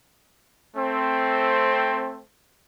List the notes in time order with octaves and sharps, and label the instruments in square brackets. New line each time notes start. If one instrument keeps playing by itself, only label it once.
[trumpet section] A3 C4